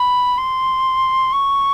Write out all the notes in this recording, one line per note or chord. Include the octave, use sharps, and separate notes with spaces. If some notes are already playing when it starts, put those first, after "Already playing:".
Already playing: B5
C6
C#6